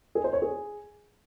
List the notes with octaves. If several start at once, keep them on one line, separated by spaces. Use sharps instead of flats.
G#4
C5
C#5
G#4